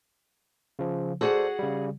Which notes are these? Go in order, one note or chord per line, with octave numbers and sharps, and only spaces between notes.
C#3 F3
F#4 G#4 A4 C5 D5 F#5
C#3 G3